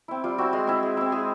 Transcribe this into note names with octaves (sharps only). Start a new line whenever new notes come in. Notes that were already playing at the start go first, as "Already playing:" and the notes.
C4 E4
G3 F4
C4 E4 F#4
G#3
C4 E4
G#3
C4 E4
G#3 G#4